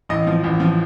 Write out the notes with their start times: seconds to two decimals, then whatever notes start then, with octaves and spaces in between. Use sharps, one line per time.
0.09 A1 D#5
0.27 F3
0.44 A1
0.60 F3